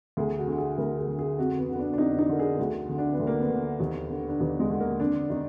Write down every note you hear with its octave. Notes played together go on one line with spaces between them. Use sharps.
D2 G#4
F#4
D3
G#4
D2 A#4
G#4
D3
G#4
F2 F#4
B3
D3 B3
D4
D4
F2 D#4
D4
D#4
D3 A#4
G#4
D2 F#4
D3
D4
B3
D2
A#3
B3
D3
D#2
D3
D4
D#2 B3
G#3
D3
A#3
F2 D4
D#3 D#4